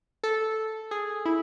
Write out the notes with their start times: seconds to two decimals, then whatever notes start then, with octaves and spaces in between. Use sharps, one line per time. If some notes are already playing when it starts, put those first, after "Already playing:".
0.24 A4
0.91 G#4
1.25 E4